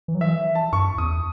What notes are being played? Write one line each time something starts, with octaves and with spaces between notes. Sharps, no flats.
E3
F#3
E3 E5
A5
F#2 C#6
E2 D#6